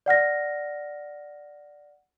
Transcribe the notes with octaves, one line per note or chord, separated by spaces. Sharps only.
D5 F#5 F6 A#6